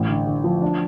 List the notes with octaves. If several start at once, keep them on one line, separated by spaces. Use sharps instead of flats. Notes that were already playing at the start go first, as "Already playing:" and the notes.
Already playing: A1
D3
D3
F3
D4